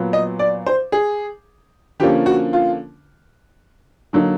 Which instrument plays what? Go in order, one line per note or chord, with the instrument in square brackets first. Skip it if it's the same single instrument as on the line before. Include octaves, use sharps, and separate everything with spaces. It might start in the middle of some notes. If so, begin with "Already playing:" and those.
Already playing: [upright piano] A#2 F#3 B3
D#5
D5
C5
G#4
D3 F3 A#3 C#4 G4
F#4
F4
D3 F#3 A#3 D#4